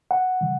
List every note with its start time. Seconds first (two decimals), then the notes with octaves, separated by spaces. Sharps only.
0.11 F#5
0.41 C#3 E3 G3